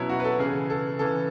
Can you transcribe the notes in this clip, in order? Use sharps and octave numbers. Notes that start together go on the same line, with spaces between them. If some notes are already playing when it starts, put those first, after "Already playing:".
Already playing: B2 F#3 C#4 E4
F#4
B4
A4
C#3 E3 G#4
A4
C#3 E3 A4